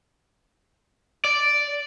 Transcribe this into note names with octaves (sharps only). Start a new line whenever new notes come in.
D5